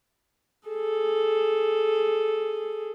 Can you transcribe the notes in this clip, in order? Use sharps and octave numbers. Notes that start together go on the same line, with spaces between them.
G#4 A4